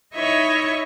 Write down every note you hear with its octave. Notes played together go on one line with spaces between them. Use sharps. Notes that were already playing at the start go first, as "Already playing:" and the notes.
D#4 E4 C#5 D#5 E5 C#6